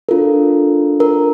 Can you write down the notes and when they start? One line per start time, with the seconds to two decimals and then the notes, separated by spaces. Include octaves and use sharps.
0.09 D4 F4 A4 A#4
1.00 A#4